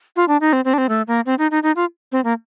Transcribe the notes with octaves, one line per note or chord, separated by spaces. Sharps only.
F4
D4
D#4
C4
C4
D4
C4
A3
A#3
C4
D#4
D#4
D#4
F4
C4
A#3